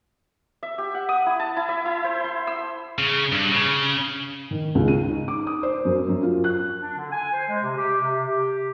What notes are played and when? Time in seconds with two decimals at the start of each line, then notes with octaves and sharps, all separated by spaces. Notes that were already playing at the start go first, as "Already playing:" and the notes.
0.63 E5
0.78 G4
0.95 F#5
1.09 D#6
1.26 E4
1.40 A5
1.57 E4
1.69 E5
1.85 E4
2.04 C5
2.24 C6
2.47 E6
2.98 C#3
3.32 G2
3.52 C#3
4.51 D#3
4.75 C#2
4.88 D#7
5.10 D#4
5.28 D6
5.47 D#6
5.63 C5
5.85 F#2
6.09 F#2
6.23 F4
6.44 F#6
6.80 D4
6.96 D3
7.11 G#5
7.32 C5
7.48 G#3
7.63 C3
7.76 G4
8.00 C3
8.27 G4